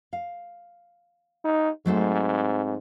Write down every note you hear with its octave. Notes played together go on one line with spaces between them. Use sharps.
F5
D#4
G#2 F#3 A3 C4